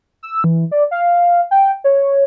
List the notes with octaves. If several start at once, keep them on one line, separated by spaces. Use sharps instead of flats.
E6
E3
D5
F5
G5
C#5